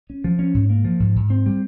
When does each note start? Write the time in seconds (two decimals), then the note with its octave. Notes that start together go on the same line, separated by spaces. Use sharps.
0.10 C#4
0.24 F3
0.39 C#4
0.54 G#2
0.69 A#3
0.85 F3
1.00 G#2
1.16 G#2
1.30 C4
1.46 G3